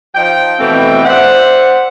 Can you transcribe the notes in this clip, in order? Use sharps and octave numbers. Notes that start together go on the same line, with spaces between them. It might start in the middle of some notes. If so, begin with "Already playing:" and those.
F3 D#4 G5
B2 E3 A3 C4 G5
C5 D5 E5 F#5